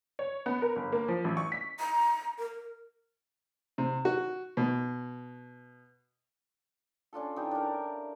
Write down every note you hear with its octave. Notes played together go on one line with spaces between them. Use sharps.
C#5
B3
A#4
G1
A#3
F3
A1
C#6
B6
A#5
A#4
C3
F#4
B2
C#4 D4 F4 A4
E3 D#4 G4
D4 A#4